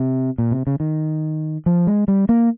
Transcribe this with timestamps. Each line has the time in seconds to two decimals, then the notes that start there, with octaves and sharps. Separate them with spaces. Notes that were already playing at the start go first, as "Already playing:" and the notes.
Already playing: C3
0.38 A#2
0.51 C3
0.67 C#3
0.80 D#3
1.66 F3
1.87 G#3
2.08 G3
2.29 A#3